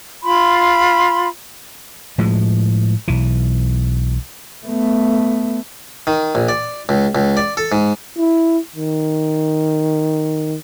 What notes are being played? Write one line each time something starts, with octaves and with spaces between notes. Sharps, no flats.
F4 B5 C6
A2 F3 G#3
B1 E3
A3 B3
D#3
A#1
D5
C#2
C#2
D5
A4
G#2
E4
D#3